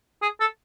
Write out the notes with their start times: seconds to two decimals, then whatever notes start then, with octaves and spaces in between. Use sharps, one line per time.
0.22 G#4
0.40 A4